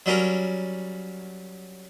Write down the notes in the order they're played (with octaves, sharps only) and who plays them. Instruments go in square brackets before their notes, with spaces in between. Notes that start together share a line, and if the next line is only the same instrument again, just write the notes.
[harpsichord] F#3 G3 C#4 A#4